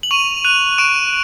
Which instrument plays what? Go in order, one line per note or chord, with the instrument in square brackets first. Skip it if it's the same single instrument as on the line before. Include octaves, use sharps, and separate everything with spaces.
[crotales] F#7
C#6 D#7 F7
F#6 D#7 F7
C#6 D7 E7